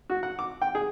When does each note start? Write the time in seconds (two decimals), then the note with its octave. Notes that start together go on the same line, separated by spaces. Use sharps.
0.10 F#4
0.23 F#5
0.39 D6
0.62 G5
0.75 G#4